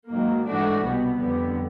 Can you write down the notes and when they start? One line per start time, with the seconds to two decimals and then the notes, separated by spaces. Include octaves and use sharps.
0.10 G#2 D#3 F#3 A#3
0.47 G#2 E3 A3 D4 F#4
0.84 C2 B2 G3 B3
1.19 F2 D3 G3 B3